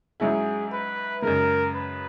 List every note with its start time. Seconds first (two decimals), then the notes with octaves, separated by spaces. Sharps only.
0.20 G#2 F#3 C#4 E4 G#4
0.72 B4
1.22 F#2 C#3 G#3 A#4
1.74 B4